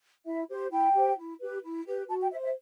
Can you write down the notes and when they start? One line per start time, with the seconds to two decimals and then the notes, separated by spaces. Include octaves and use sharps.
0.25 E4 E5
0.49 G4 C5
0.71 E4 G5
0.94 G4 C5
1.17 E4
1.40 G4 B4
1.63 E4
1.85 G4 B4
2.08 F#4 A5
2.20 G5
2.31 C5 E5
2.42 E5